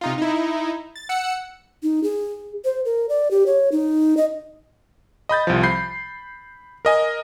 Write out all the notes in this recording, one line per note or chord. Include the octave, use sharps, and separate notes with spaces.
C3 D#4 F4
D#4 E4
A6
F#5 E6 C#7
D#4
G#4
C5
A#4
D5
G4
C#5
D#4
D#5
D#5 B5 G6 A6
C2 F3
B5 G6 C7
A#4 D#5 G#5